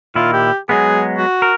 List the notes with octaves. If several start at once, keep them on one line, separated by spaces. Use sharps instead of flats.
A#2 D#3 E4 F4
G4
F#3 G#3 B3 G#4
F#4
A#4